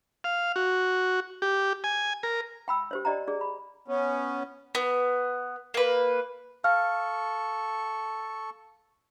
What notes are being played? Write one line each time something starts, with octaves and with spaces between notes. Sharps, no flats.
F5
F#4
G4
G#5
A#4
G5 B5 E6
G4 C5 C#5
G4 D5 D#5 G5 A#5
G#4 D5
B5
B3 C#4
B3
A#3 B4
A4 F5 C#6 F6